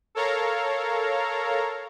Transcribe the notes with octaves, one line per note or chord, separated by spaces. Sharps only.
A4 A#4 C#5 F5 A#5